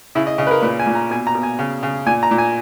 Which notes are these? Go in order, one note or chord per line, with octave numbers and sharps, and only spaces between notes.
C#3 E4
D#5
C#3 D#5
B4
A#4
A#2 B4
G#5
A#2
A#5
B2 G#5
A#5
B2
G#5
C#3
C#3
A#2 G#5
A#5
A#2
G#5